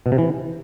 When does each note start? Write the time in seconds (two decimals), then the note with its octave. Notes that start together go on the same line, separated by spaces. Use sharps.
0.06 B2
0.12 C3
0.18 E3